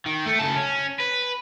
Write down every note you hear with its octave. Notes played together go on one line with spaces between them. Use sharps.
D#3
A3
C#3 A5
C#4
B4